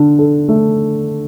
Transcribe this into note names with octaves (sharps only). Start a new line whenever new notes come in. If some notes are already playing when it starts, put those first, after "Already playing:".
Already playing: D3 D4
A4
A3